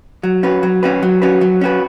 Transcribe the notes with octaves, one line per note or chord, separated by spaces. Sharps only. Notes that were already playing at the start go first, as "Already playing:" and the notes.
F#3
C#4 F#4 B4
F#3
C#4 F#4 B4
F#3
C#4 F#4 B4
F#3
C#4 F#4 B4